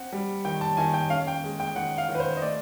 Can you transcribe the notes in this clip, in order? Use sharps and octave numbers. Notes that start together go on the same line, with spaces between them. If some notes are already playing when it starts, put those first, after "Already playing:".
Already playing: C4 F#5
G3
D#3 G5
A5
D#3 G#5
G5
C#4 F5
G5
G#3
G5
D#3 F#5
F5
D#3
B4
C5
D#5
A3 D5